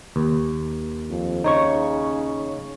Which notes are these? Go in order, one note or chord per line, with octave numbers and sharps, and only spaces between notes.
D#2
F2
C#3 D#4 C#5 C#6